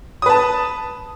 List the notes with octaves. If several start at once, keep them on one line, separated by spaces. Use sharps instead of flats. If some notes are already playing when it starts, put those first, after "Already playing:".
B4 A5 D#6